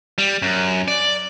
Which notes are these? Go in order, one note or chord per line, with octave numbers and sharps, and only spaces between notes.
G3
F#2
D5